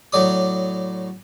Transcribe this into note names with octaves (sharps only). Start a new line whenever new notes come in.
A2 F#3 D5 D#6